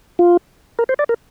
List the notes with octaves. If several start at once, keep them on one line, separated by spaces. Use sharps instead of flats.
F4
A#4
C5
D5
A#4